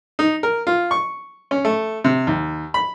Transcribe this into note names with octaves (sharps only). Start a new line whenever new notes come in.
D#4
A#4
F4
C#6
C#4
A3
C3
D#2
B5